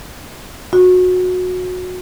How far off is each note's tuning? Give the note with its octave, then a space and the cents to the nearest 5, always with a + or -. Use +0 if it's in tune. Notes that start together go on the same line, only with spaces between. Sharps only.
F#4 -20